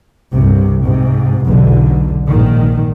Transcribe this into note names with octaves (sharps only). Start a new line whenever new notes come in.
C2 G2 C3
G#2 C3
B1 E2 B2 D3
A#1 G#2 D#3